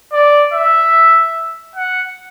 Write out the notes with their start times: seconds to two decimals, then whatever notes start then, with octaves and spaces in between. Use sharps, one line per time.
0.13 D5
0.53 E5
1.76 F#5